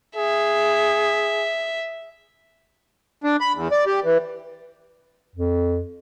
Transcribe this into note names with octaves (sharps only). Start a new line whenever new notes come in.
G#4 E5
D4
B5
E2
D5
G4
E3
F2